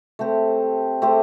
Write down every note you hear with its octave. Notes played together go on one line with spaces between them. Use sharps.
A3 C4 G4 C5
A3 C4 G4 C5